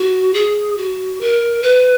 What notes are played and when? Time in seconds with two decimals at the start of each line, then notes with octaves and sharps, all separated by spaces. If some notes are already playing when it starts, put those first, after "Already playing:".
Already playing: F#4
0.34 G#4
0.78 F#4
1.21 A#4
1.63 B4